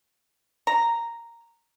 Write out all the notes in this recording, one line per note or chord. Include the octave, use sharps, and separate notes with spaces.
A#5